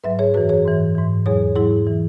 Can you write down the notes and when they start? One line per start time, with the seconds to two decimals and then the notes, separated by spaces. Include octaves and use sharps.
0.04 G#2 F#3 B4 E5
0.19 G#4 C#5
0.34 F#2 E3 F#4 B4
0.49 G#4 C#5
0.65 G#2 E3
0.95 G#2 E3
1.26 E2 B2 F#3 G#4 C#5
1.56 G#2 F#3 E4 G#4
1.87 E3